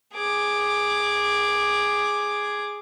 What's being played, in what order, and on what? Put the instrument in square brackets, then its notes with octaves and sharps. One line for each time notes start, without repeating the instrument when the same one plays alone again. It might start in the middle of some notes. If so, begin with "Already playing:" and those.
[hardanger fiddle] G#4 D6